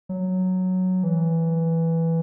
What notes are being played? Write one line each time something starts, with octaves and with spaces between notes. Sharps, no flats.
F#3
E3